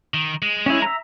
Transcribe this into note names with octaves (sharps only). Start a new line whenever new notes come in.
D#3
G#3
C#4 E4
E5 A#5